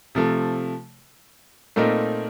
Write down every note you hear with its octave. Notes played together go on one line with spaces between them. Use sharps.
C3 F3 A3
A#2 A3 C4 D#4 A#4